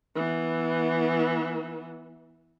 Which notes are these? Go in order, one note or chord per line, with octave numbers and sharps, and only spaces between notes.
E3 B3